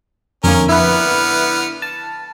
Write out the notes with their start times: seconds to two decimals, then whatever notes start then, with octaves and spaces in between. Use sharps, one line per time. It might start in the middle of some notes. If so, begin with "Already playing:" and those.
0.44 F2 D3 A#3 C#4 A#4
0.69 D3 B3 E4 B4 F6
1.82 A5